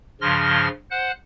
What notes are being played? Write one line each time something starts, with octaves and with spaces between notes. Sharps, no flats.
G2 C#3 F3 C6 F6 A#6
C5 F#5 F#6